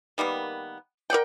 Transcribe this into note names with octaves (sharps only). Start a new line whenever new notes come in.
D#3 G3 A#3 B3
A#4 D5 F#5 G5